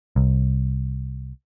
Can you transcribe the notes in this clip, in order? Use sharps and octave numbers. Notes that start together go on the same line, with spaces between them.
C2